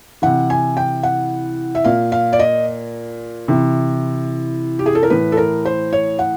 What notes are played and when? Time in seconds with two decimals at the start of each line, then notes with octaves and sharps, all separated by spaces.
0.22 C3 E3 F#5
0.50 G#5
0.77 G5
1.03 F#5
1.75 E5
1.84 A#2 F5
2.12 F5
2.33 D5
2.39 D#5
3.48 C3 E3
4.79 G4
4.86 G#4
4.95 A4
5.03 A#4
5.10 A2 E3 B4
5.32 A4
5.37 A#4
5.65 C5
5.93 C#5
6.19 F#5